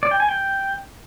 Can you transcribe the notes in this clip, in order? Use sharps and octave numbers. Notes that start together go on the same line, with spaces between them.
D5
G5
G#5
G5